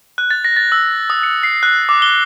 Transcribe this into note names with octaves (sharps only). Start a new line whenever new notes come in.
F#6
A6
A#6
A6
E6
D#6
C#7
C7
F#6
D6
G7